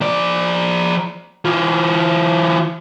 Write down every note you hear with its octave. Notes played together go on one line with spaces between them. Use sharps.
F3 D5
E3 F4